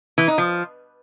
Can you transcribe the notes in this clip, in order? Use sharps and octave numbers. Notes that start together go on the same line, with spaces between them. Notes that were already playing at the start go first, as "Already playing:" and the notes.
E3
D#4
F3